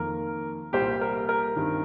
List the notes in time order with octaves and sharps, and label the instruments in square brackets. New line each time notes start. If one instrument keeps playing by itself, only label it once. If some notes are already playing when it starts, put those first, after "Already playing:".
Already playing: [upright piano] F2 D#3 A#3 A#4
C2 A#2 G3 A#3 G4 C5
A#4
A#4
G2 D#3 C4